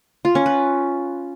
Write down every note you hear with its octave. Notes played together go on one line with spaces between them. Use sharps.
F4
C#4
B4